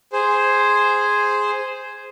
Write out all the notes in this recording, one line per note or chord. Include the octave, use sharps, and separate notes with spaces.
G#4 C5